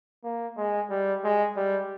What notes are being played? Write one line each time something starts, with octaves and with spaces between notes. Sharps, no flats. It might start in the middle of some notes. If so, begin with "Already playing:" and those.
A#3
G#3
G3
G#3
G3